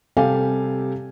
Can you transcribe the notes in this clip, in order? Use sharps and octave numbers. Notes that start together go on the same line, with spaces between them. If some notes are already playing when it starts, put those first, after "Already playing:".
C3 G3 G4 A4 F5 G#5